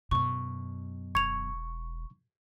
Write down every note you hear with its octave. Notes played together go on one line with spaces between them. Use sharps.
F#2 B2 C#6
E1 C#6 G#6 F7